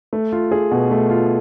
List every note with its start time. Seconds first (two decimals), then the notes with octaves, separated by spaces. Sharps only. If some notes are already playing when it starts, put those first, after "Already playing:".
0.13 A3
0.32 F4
0.51 G#4
0.71 B2
0.91 A3
1.10 F4